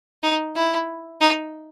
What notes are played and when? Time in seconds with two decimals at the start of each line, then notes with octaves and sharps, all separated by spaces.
0.23 D#4
0.56 E4
1.21 D#4